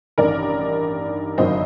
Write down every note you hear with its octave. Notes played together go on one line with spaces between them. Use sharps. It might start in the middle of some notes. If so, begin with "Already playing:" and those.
A1 G2 D#3 A#4 D5
G1 F#2 D#3 F#3 C5 D#5